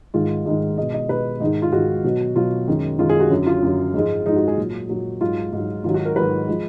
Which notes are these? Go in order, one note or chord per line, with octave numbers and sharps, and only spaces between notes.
G#2 D#3 G#3 F4
G#2 D#3 G#3
B2 G#3 D#5
D#5
B2 G#3 B4
G#2 D#3 G#3 D#4
F4
G#2 D#3 G#3 F#4
B2 F#3
B2 F#3 F4
F#2 D#3 G#3
F#2 D#3 G#3 F4
G#4
F#4
F#2 D3 F#3
F4
F#2 D3 F#3
G#2 F3 G#3
G#2 F3 G#3 D#4
F#4
G#4
A#2 F#3
A#2 F#3
G#2 F#3 F4
G#2 F#3
G#2 D#3 F#3 F4
F#4
A#4
G#2 D#3 F#3 B4
F3 G#3